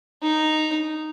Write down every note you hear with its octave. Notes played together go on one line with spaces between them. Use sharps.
D#4